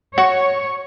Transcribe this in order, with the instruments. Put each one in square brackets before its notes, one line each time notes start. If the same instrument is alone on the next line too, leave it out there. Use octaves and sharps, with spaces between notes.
[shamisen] F#4 [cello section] C#5